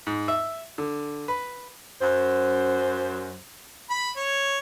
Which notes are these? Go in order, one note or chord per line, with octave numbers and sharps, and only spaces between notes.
G#2
E5
D3
B4
F#2 C5
B5
C#5